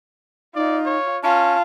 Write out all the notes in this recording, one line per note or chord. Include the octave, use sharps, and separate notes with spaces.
D#4 F4 D5
C#5
C#4 F4 A5